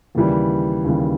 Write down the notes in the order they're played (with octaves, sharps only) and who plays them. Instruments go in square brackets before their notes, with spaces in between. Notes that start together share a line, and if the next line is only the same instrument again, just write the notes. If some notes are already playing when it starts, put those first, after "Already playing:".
[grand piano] D#2 C#3 E3 G3
D#2 C#3 E3 G3